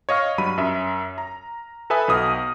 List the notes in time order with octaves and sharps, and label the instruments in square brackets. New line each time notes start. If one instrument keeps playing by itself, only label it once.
[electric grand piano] C#5 D#5 F5 F6
G2 F#3 B5 D#7
F#2 E5
A#5
A4 B4 E5 G#5 D#6
B1 B2 D#6 F6